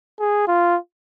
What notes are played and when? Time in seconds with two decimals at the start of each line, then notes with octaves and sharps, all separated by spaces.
0.20 G#4
0.48 F4